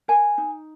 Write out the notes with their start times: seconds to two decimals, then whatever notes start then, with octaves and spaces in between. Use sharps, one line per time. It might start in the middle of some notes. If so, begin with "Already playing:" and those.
0.08 A#4 G#5
0.38 D#4